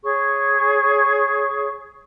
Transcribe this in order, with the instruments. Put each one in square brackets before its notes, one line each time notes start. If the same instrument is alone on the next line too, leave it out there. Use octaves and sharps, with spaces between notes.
[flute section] G#4 C#5 C#6